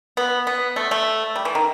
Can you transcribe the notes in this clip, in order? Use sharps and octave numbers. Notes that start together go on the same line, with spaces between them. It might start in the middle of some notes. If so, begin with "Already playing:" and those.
B3
B3
A3
A3
G3
E3
D#3